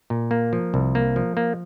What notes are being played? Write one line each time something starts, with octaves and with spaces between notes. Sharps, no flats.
A#2
A#3
F3
C2
A#3
F3
A#3